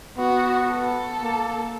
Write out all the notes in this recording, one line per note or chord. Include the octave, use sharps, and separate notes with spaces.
B3 F#4
A4
A#3